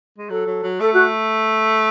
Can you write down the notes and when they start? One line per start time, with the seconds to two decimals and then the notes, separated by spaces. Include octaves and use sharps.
0.18 G#3
0.30 F#3 A4
0.46 F#3
0.63 F#3
0.80 A3 A4
0.93 F#4